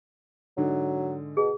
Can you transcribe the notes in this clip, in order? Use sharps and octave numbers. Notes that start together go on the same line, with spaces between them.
G#2 D3 F#3
B2 G#4